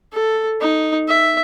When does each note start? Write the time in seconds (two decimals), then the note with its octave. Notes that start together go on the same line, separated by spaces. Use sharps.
0.13 A4
0.61 D#4
1.08 E5